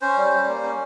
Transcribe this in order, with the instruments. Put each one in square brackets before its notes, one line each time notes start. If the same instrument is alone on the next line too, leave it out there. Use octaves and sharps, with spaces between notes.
[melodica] C#4 C5
G3
G3
A#3
C#4